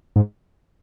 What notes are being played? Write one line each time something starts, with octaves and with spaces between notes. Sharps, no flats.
G#2